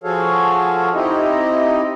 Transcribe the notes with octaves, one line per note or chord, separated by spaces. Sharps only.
F3 F#4 G#4 A4 C#5 F5
C4 D#4 E4 G4 D#5